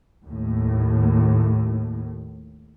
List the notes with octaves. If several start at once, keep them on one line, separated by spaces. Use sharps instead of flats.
D#2 A2